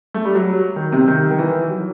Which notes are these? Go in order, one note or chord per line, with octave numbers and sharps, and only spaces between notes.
A3
G3
F#3
D#3
C3
D#3
D#3
E3
F#3